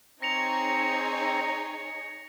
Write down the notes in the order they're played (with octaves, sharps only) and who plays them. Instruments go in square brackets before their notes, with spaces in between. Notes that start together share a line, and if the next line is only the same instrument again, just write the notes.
[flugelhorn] C4 [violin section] D#4 G#4 C#5 [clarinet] A#5 [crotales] A#6 C#7 F7